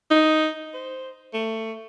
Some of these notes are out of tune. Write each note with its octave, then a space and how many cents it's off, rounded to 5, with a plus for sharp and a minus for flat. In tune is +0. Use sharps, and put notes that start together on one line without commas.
D#4 +5
C5 -5
A3 +20